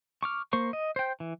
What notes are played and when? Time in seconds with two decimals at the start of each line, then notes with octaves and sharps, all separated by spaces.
0.23 C#6 D6 F6
0.53 A#3 C5 C#6
0.73 D#5
0.96 C5 G5
1.20 E3